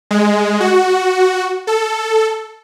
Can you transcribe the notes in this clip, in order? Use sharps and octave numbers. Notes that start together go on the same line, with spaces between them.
G#3
F#4
A4